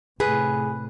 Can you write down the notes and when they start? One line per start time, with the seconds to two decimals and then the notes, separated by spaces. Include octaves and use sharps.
0.20 A2 C3 G#4 B4